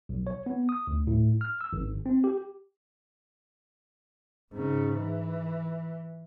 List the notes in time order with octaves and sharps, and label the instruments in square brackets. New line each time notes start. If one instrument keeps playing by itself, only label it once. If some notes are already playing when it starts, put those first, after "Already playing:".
[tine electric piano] B1
C#5
B3
D#6
D2
A2
F6
E6
G#1
C4
G4
[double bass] G#2 C#3
E3